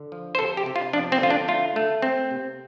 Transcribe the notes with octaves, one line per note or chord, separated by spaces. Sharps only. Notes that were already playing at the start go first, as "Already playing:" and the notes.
Already playing: D3
F3
C5
C3 A4
G4
C3
F4
F3 D4
C4
D3 F4
D4
A3 F4
A3
C4
C3